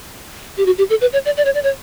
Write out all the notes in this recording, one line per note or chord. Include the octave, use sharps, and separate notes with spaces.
G4
F#4
G4
A4
B4
C#5
D5
D5
C#5
D5
C#5